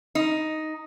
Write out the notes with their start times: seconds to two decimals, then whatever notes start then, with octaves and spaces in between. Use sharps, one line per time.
0.15 D#4